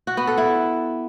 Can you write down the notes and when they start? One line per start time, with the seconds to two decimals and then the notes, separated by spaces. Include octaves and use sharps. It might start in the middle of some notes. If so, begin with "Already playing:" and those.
0.07 F#4
0.17 B3
0.27 A4
0.38 E4